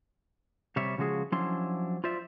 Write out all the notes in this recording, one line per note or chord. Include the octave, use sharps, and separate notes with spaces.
C3 G3 C#5 E5
C#3 F3 G#3 F#4 G#4
F3 F#3 C#4 D4 E4 C6
F4 C5 D5 E5